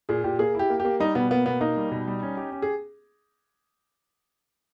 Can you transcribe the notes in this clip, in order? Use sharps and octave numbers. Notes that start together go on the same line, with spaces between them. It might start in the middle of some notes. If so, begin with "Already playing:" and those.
A#2 G#4
A#2 G4
A#3 G#4
E4 G4
A#3
G4
A#3
G3 D#4
B2 B3
A#3 B3
B2 B3
A#3 D#4
G3
B2
G3
C#4
G4
C#4
G#4